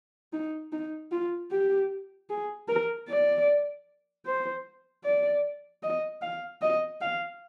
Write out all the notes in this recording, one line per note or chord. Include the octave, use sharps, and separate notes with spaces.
D#4
D#4
F4
G4
G#4
A#4
D5
C5
D5
D#5
F5
D#5
F5